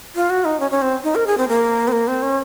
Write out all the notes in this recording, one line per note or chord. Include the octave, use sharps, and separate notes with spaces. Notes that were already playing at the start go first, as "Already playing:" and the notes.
F4
F#4
D#4
C#4
C#4
C4
D#4
A#4
G#4
C4
A#3
C4
A#3
C4
C#4